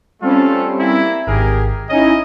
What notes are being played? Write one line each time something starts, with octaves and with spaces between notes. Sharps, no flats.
G3 A3 C4 C#4 F4 A4
A#3 E4
G#1 G4 G#4 A#4
C#4 D#4 E4 D#5